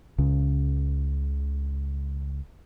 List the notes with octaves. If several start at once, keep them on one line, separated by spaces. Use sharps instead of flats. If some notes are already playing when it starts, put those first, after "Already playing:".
C#2 C#3